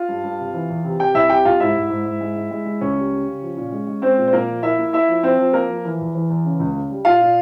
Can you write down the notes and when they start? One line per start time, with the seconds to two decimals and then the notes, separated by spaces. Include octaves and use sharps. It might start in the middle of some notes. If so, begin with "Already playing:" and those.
Already playing: F4 F5
0.09 G2
0.23 G2
0.39 C3
0.54 E3
0.70 E2
0.85 C3
0.99 C3 G4 G5
1.14 C2 E4 E5
1.30 C3 G4 G5
1.45 C2 F4 F5
1.60 G#2 E4 E5
1.75 G#2
1.90 G#2
2.05 G#2
2.21 G#3
2.36 G#3
2.51 G#3
2.66 G#3
2.81 C#2 C#4 C#5
2.96 G3
3.12 G3
3.27 C#3
3.42 F3
3.57 A#2
3.72 G#3
3.87 G#3
4.02 G#3 C4 C5
4.17 A#2
4.28 C5
4.33 A#2 A#3 A#4
4.48 F3
4.63 A#3 E4 E5
4.79 A#3
4.93 A#3 E4 E5
5.08 F3
5.23 F3 C4 C5
5.38 F3
5.53 A#3 A#4
5.69 F3
5.85 E3
6.00 E2
6.15 E3
6.30 E2
6.45 C#3
6.60 C#2
6.75 C#3
6.90 G3
7.05 A#2 F4 F5
7.21 A#2